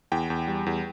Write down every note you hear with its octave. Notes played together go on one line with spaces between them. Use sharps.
E2 G5
E2
G3
E2